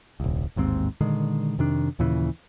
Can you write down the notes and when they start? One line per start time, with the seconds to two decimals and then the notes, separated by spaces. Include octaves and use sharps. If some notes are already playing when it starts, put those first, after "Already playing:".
0.20 D#1 C2
0.56 A1 D#2 G#2 C4
1.01 A#2 D3 D#3 G#3
1.58 F2 C3 D#3 D4
1.99 D#2 A#2 C#3 E3